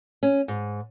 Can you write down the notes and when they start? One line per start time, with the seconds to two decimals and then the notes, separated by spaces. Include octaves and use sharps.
0.23 C#4
0.48 G#2